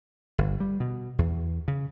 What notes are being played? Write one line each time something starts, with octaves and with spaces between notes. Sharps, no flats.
G1
G3
B2
E2
C#3